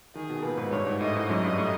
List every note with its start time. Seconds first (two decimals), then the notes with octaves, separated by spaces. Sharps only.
0.15 D#3 G#4
0.30 B2
0.43 A#2 B4
0.58 G#2
0.71 G2 C#5
0.87 G#2
1.01 A2 D#5
1.15 G#2
1.29 F#2 D#5
1.43 G2
1.58 A2